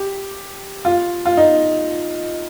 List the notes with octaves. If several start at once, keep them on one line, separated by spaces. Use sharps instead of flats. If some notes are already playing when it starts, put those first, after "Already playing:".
Already playing: G4
F4
F4
D#4